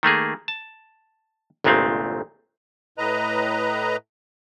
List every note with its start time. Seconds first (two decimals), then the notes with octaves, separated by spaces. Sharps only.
0.03 D#3 A3 A#3 G#4
0.48 A5
1.64 G1 C2 A#2 G#3 A3 C4
2.98 A2 B4 D#5 A#5